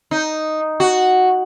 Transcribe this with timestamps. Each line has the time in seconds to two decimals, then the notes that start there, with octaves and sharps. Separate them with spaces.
0.11 D#4
0.80 F#4